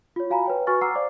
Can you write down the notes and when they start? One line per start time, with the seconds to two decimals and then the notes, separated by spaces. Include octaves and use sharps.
0.16 F4 C#5
0.30 F#4 F5 G#5 A#5 B5
0.45 B4 C#5 G5
0.67 F#4 B4 G#5 C#6 F6 A6
0.81 F#5 A#5 D6 E6 F6 C7
0.95 C5 D5 F5 D6